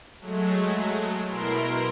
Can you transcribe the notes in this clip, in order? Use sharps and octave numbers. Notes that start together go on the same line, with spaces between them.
F#3 G#3 A3
B2 E4 A#4 C6 D7